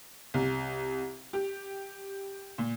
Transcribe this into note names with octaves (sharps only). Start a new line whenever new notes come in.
C2
G4
A#2